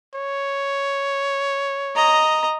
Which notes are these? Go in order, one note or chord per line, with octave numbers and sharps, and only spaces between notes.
C#5
D#5 A#5